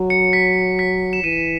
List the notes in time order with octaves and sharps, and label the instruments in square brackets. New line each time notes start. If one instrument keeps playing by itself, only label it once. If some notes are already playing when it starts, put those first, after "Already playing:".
Already playing: [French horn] F#3
[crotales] C#7
B6
B6
E7
[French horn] E3 [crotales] D#7